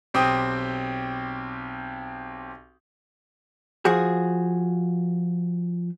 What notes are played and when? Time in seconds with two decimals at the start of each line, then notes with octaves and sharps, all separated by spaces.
0.14 B1 C4 G4 G5 D#6
3.85 F3 F#4 G#4